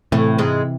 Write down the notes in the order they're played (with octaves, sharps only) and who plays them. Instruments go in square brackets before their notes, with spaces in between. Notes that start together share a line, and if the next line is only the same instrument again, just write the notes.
[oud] A2 A3 [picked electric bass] C3 E3
[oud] G#2 G#3